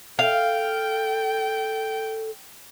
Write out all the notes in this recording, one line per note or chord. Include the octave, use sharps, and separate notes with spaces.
A4 F5 G5